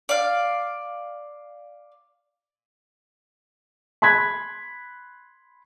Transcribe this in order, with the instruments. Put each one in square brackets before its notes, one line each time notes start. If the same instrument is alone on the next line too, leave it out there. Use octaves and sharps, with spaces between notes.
[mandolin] D5 F5
[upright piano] B5 C6 F#6 G#6 B6